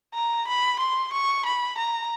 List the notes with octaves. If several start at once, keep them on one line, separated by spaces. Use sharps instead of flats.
A#5
B5
C6
C#6
B5
A#5